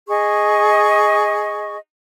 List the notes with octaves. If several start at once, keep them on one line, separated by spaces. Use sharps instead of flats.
G#4 D#5 C#6